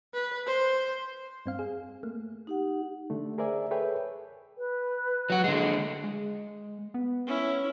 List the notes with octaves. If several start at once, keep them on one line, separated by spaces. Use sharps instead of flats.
B4
C5
G2 C4 F5
G#4
A3 A#3
D#4 G4 F#5
D3 A3
G#4 A#4 C5 D5 E5 G#5
G#4 A4 B4 C#5 E5 G5
B4
F#3 F#4
D3 G#3
G#3
B3
C#4 E4